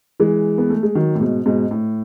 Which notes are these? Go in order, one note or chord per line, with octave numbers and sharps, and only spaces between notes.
E3 G#3
B3
A3
G#3
D#3 F#3
A2
G#2 B2
G#2 B2
A2